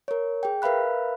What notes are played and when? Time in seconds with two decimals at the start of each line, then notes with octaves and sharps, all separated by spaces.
0.08 A#4 C#5
0.43 G#4 G5
0.62 A#4 B4 E5 F5 B5 F#6